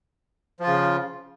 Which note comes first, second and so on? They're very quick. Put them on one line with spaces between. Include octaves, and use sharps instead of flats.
F3 F4 C#3